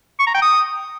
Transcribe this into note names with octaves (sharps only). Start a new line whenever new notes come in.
C#6
A#5
G5
D#6